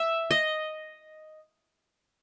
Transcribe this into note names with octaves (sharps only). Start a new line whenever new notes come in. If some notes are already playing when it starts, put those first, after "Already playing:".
Already playing: E5
D#5